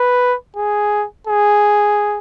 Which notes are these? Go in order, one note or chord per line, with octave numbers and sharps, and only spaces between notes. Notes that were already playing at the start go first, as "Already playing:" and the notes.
Already playing: B4
G#4
G#4